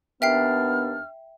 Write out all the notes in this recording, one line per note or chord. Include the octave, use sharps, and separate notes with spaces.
D#2 B3 D4 E5 G5 F6 C7